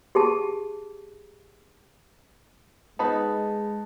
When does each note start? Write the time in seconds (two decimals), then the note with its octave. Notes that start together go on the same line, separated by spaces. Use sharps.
0.15 G4 G#4 A5
2.99 G#3 B3 D#4 A5 B5